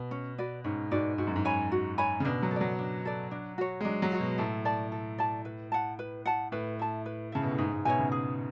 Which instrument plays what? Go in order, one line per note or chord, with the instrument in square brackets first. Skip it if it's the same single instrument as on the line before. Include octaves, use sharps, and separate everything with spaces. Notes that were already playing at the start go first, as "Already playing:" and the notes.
Already playing: [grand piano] B2
[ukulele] C#4
F#4 B4 D5
[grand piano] G#2 [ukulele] C#4
[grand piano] G#2 [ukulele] F#4 B4 D5
[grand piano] G#2 [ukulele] F#4
[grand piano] F#2
G#2
[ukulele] C#5 G#5 B5
F#4
C#5 G#5 B5
[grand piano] C#3
[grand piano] B2 [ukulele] D4
[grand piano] F#3
[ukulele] A4
[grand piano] F#3 [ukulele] D5
[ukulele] D4
A4 D5
D4
F#4 C#5
[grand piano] G#3
[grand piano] F#3 [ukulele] D4
[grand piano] F#3
[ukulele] F#4 C#5
[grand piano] B2
[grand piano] A2 [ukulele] A4
[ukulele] D5 A5
A4
D5 A5
B4
F#5 A5
B4
F#5 A5
[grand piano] A2 [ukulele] B4
[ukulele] E5 A5
B4
[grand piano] C#3 [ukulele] E5 A5
[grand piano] B2
A2
[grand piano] G#2 [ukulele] G#4
[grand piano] G#2
[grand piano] B2 [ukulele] C#5 E5 G#5
[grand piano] C#3
[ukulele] G#4